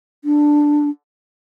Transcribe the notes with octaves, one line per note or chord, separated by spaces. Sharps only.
D4